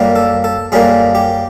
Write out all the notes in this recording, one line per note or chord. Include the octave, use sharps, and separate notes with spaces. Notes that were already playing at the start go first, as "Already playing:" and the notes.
Already playing: F#2 D3 G3 A#3
A4
A4
F#2 D3 G3 A#3 G#4
G4